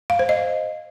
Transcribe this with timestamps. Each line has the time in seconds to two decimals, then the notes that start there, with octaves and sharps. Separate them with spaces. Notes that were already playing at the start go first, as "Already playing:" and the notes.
0.10 F5
0.19 C5
0.29 D#5